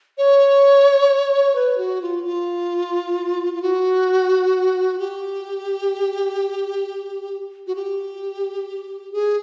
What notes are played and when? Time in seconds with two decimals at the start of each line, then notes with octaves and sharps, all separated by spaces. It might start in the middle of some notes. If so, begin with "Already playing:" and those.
0.18 C#5
1.55 B4
1.78 F#4
2.01 F4
2.24 F4
3.54 F4
3.62 F#4
4.99 G4
7.67 F#4
7.75 G4
9.12 G#4